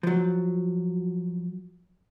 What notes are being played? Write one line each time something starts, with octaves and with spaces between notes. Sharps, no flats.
F3 F#3